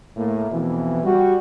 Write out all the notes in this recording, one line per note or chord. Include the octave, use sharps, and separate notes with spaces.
A2 A3 A#3
F2 B2 E3
G3 F#4